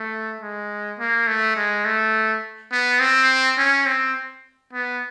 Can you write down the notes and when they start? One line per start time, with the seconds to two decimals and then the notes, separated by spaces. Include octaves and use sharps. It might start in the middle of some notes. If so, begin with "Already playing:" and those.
Already playing: A3
0.41 G#3
0.99 A#3
1.27 A3
1.56 G#3
1.85 A3
2.72 B3
3.00 C4
3.57 C#4
3.86 C4
4.73 B3